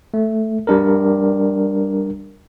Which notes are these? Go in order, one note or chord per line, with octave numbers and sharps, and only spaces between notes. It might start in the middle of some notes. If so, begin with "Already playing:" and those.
A3
G3 D4 A#4